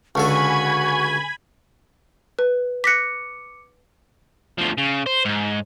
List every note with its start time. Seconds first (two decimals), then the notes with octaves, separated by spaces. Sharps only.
0.15 C#2 D3 F#4 A4 G#5 B5 C#6 G#6
2.39 B4
2.84 D6 F#6 A#6 B6 C#7
4.58 D2 F3
4.78 C#3
5.06 C5
5.25 G#2